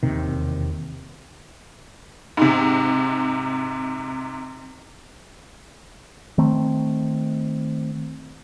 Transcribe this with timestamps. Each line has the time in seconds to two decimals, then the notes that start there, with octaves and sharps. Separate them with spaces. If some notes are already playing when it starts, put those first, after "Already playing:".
0.03 E1 D#2 C3 D#3
2.37 G#2 C3
6.38 D#3 A3 C4